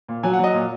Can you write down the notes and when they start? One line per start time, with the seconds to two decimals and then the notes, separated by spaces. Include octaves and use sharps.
0.09 A#2
0.23 F#3 G#5
0.33 F#5
0.39 F#3 D#5
0.54 A#2